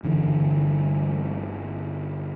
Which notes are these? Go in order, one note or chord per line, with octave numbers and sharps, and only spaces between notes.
G1 D3 E3